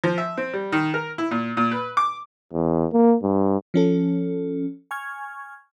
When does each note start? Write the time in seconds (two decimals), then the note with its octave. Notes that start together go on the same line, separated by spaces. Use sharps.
0.04 F3
0.18 E5
0.37 C4
0.53 G3
0.72 D#3
0.94 A#4
1.18 E4
1.31 A#2
1.57 A#2
1.71 B4
1.97 D6
2.53 E2
2.93 A#3
3.23 G2
3.74 F3 C#4 A4
4.91 G#5 C#6 F6 G#6